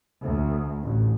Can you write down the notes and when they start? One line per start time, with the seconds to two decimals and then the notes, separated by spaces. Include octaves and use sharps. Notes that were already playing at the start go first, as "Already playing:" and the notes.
0.23 D2
0.82 A1